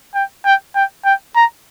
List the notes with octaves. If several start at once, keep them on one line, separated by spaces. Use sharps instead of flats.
G5
G5
G5
G5
A#5